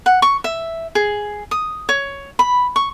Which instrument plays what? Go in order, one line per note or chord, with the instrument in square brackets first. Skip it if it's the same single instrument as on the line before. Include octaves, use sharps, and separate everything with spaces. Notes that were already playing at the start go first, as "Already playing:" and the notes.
[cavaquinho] F#5
C#6
E5
G#4
D#6
C#5
B5
C#6